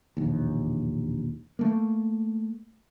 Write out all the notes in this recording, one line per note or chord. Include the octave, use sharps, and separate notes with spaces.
E1 A#1 D#2
A3 A#3